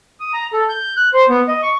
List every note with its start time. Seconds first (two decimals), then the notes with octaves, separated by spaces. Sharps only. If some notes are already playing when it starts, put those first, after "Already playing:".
0.20 D#6
0.33 A#5
0.53 A4
0.69 G6
0.97 F#6
1.13 C5
1.29 B3
1.48 D#5
1.63 C#6